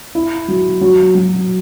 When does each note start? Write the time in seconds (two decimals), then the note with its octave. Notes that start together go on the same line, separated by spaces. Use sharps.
0.15 E4
0.48 F#3
0.81 F#3
1.15 F#3